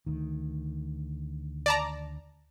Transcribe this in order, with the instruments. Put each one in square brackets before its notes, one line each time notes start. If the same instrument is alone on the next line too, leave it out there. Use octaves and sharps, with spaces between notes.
[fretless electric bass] D2 D#3
[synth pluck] D5 A5 A#5